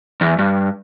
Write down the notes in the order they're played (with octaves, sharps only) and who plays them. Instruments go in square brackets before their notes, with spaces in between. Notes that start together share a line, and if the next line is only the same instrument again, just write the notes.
[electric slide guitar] E2
G2